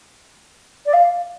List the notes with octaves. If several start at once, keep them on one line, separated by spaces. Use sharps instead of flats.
D5
F5